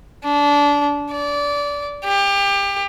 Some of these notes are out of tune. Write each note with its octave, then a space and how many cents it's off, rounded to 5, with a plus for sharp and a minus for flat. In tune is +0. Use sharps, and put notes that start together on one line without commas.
D4 -25
D5 -25
G4 +25